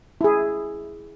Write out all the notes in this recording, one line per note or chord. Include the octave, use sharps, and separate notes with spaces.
E4 G#4